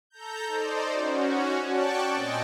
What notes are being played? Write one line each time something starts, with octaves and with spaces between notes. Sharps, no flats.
A4 A#5 G6
D#4 C5 D5
C#4 F#4
D5 G5 A5 C#6 F#6
A#2 C4 D#5 G5 G#5 A6